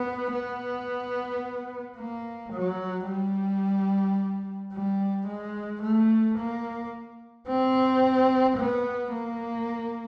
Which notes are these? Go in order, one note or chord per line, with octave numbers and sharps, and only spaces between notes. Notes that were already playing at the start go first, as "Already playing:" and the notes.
Already playing: B3
B3
A#3
F#3
G3
G3
G#3
A3
A#3
C4
B3
A#3